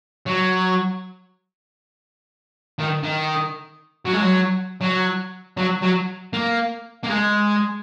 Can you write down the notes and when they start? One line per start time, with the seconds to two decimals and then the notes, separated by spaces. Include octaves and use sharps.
0.26 F#3
2.79 D#3
3.03 D#3
4.05 F#3
4.13 G#3
4.22 F#3
4.81 F#3
5.57 F#3
5.82 F#3
6.33 A#3
7.03 A#3
7.09 G#3